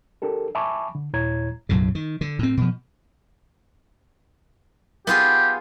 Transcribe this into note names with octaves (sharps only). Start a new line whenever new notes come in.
D4 G4 A4 A#4
E5 G#5 A5 B5 C#6 D6
D3
D#2 A#2 E4 C#5 A#5 G#6
B1 F#2 A2 C#3
D#3
D3
A2 C4
B2 F3
B3 F4 G4 G#4